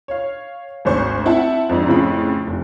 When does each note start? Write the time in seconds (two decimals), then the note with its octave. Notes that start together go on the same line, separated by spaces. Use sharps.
0.08 C#5 F5
0.85 G#1 D2 C5 C#6
1.25 C4 E4 E5 F#5 A5
1.69 F2 G#2 D4
1.87 F2 A2 C#3 F4 B5
2.47 F1